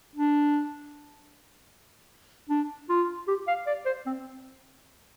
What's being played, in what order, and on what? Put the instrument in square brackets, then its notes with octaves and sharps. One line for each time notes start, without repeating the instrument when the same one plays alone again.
[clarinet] D4
D4
F4
G4
F5
D5
C5
C4